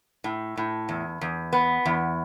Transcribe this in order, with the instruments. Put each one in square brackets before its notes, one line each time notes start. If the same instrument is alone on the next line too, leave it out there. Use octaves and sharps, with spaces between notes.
[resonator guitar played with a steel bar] A2
A2
E2
E2
B3
E2